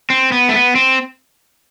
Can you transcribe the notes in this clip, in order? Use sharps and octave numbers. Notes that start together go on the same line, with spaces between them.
C4
B3
A3
B3
C4